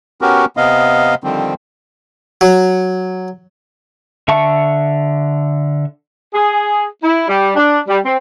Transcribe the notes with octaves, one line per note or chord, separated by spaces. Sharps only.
B3 C#4 F#4 G4 A#4
C3 B3 D#5 F5
D3 D#3 F3 G3 C4
F#3
D3 E5 A5 C#6
G#4
E4
G3
D4
G3
C4